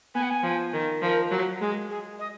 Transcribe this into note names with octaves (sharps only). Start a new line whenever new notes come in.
B3 G#5
F#5
G#5
F3
D#3
F3 A#4
F#3
G#3 G#4
G#4
D#5